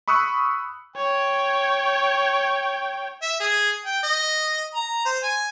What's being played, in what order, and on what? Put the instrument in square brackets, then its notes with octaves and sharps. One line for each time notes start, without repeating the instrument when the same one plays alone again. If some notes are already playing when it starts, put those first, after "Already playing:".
[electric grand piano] B5 C#6 D#6 E6 F#6 C#7
[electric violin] C#5 [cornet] G5
[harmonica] E5
G#4
G5
D#5
A#5
C5
G#5